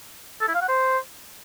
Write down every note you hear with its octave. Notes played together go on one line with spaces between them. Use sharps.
A4
E4
F5
F#5
C5